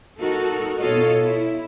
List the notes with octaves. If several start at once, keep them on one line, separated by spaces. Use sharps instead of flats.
D#4 F#4 A4 A#4
B2 F4 A4 C#5 D#5
E4